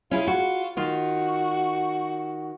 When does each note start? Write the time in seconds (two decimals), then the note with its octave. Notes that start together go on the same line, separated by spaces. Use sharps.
0.11 C#4 E4 F4 G#4
0.27 F#4
0.77 D#3 F4 F#4